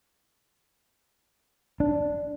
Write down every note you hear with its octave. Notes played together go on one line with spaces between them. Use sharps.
D4